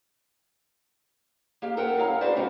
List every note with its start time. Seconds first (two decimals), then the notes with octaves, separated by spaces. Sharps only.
1.62 A#3 G4 F5
1.77 A4 A#4 C5 F#5 G5
1.96 F#2 E4 D#5 F5 A#5
2.21 D4 F#4 G#4 B4 C5 D5
2.36 G#2 C3 G3 C4 D#4 F#4